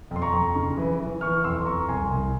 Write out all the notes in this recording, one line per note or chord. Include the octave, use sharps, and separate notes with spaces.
F2
C6
A#5 C#6
F2
C#3
E3
E3
E3 C#6 F6
F2 C6 E6
F2 A#5 C#6
C2 G#5 C6
C2